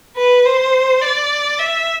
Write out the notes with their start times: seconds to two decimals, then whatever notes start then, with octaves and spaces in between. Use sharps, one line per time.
0.17 B4
0.46 C5
1.01 D5
1.59 E5